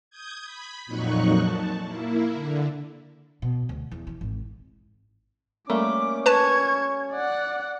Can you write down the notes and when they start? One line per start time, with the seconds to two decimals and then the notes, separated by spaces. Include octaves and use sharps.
0.10 D#6 G6 G#6
0.44 B5
0.86 F2 A#2 F#3 D#4 C#6 F#6
1.38 A5
1.84 A#3 E4
2.33 D3
3.42 B2
3.69 D2
3.91 E2
4.07 E3
4.21 G#1
5.70 G3 A3 A#3 C#4 D6
6.26 B4 A5 C#6 G#6
7.12 D5 F#5